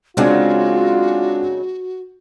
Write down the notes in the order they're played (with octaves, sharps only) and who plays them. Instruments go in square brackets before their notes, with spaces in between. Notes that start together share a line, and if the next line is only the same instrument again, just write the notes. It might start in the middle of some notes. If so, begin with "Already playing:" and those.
[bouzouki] C#3 F#3 D#4 [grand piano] G#3 C4 D4 [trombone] F4 [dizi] F#4